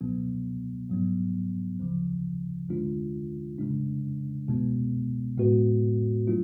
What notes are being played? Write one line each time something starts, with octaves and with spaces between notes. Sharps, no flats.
C#2 B2 F#3 B3
G#2 F#3 B3
D2 C#3 F3
D2 D3 G#3 D4 F4
C#3 G#3 D4
C#2 B2 G#3 B3
A2 G#3 B3 F#4 B4
F#3 A3 D4 F4